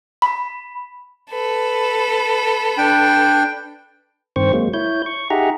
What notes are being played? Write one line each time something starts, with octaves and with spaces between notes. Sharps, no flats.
B5
A4 B4
D4 G5
G2 D#3 C4 C5 C#6
F#3 G#3 A#3
E4 C#5 G6
C#6
D#4 G4 G#4 E5 F#5 A#5